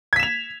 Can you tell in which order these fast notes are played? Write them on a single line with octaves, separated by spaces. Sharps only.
G#6 B6 E7 F7